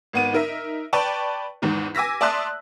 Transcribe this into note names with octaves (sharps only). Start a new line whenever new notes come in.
G#1 B3 D#7
D#4 A#4 E5
B4 D5 G5 A5 C#6
E2 G#2 D#3
G#5 D6 E6 A#6 B6
D5 E5 A5 C6 D#6 F#6